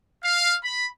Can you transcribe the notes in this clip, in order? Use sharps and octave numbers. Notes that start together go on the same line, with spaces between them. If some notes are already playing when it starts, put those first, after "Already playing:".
F5
B5